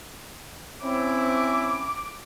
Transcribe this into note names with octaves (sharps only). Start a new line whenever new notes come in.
C4 C#4 E4 D6